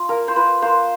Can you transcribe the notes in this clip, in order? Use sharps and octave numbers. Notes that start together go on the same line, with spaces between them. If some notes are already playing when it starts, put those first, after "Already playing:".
Already playing: F4
A#3 A#4
C5
F4 B4
A#3 C5